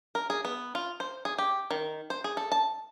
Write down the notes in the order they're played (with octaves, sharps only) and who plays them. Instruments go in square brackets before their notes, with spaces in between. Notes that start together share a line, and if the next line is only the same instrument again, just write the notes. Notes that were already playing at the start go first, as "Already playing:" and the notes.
[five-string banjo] A#4
G#4
B3
F4
C5
G#4
G4
D#3
C5
G#4
A4
A5